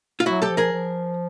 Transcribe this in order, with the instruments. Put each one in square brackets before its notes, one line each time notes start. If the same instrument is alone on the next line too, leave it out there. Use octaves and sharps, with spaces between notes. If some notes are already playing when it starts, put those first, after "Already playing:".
[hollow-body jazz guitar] F4
[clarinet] F#3 [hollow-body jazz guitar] E4 F#4
[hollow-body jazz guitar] G4 A4
[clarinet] F3
[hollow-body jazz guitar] G#4 A#4
[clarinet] F3